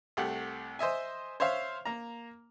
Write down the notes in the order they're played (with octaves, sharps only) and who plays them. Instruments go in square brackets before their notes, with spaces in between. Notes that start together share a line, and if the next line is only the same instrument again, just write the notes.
[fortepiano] C2 A3 G4 F#5
C5 D#5 E5 G#5
C5 C#5 E5 F5
A#3 A#5